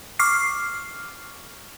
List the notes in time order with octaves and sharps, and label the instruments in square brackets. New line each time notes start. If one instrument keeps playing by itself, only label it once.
[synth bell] C#6 D6 F6 C7